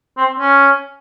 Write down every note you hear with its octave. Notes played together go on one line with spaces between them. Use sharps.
C4
C#4